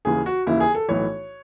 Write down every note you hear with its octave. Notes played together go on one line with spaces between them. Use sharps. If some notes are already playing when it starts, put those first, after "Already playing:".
D#2 C#3 E3 G#4
F#4
D#2 C#3 E3 E4
G#4
A4
B1 A2 E3 C#5